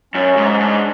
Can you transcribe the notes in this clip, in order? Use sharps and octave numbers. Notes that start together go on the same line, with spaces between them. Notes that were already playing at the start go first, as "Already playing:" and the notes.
F#2 C#4
G#2
C#4
G#2 D4